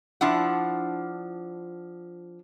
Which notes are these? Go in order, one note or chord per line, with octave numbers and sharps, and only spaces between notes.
F3 D4 E4 F#5